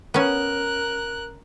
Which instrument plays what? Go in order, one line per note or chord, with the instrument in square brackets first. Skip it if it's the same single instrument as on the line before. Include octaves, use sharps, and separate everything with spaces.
[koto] B3 C#4 [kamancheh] A#4 F#6